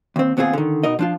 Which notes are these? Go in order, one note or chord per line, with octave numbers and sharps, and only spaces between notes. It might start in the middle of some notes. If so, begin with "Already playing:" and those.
D#2 C4
D#2 B3 C4 F4 G#4
D3 D#3
B2 D#4 A#4 D#5
F3 D4 F4